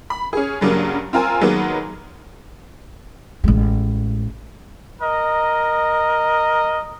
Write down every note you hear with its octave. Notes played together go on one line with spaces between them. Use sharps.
B5
C#4 G#4
G2 C#3 F#3 G3 A#3
C4 F4 A#4 G#5
D#3 F#3 G#3 A#3 B3
A1 G#3
A#4 D#5